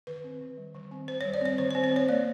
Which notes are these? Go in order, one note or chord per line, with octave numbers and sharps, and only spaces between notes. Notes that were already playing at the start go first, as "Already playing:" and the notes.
D#3 B4
C4
D#3
G3
D#3
C4
D#3 C5
C#5
G3
D5
C4 C#5
D#3 C5
C5
C4
C5
C4 C#5
A#3 D5